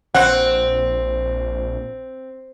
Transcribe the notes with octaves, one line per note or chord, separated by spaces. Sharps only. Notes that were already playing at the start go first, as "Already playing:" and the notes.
A#1 C4 F#5